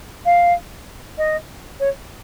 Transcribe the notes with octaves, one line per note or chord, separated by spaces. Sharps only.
F5
D#5
C#5